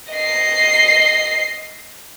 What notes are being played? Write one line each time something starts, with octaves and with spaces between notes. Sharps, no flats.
D#5 C7